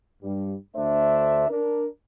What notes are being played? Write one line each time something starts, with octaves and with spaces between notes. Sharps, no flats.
G2 G3
D2 A3 D4 C5 E5
D4 A#4